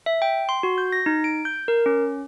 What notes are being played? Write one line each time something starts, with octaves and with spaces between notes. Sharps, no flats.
E5
G5
C6
F#4
G6
A#6
D#4
D7
G6
A#4
C#4